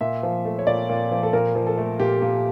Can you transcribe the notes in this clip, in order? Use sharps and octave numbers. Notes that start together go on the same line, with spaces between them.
A#2 E5
F3
A3
C#5
A#2 D5
A#2
F3
A4
A#2 A#4
F3
A4
A3
A#2 G4
A#2